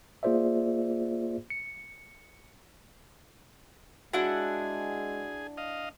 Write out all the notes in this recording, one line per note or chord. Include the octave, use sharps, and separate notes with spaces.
A#3 F4 G#4 C5 D5 E5
C#7
G#3 D4 E4 F#4 G#4 F#5
D#5 F5